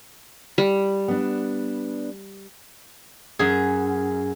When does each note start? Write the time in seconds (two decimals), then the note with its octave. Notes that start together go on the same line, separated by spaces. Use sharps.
0.58 G3
1.08 B3 D4
3.39 F#2 G#4